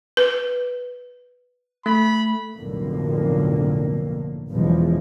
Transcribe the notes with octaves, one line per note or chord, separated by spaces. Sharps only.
B4
A3 B5
B1 F2 A2 D3 A#3
B1 E2 C#3 E3 F3 G#3